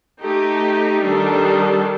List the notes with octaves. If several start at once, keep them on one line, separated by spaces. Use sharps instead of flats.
A3 D#4 G4
D#3 G3 D4 A4